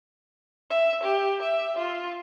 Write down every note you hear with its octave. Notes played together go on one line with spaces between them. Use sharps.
E5
G4
E5
F4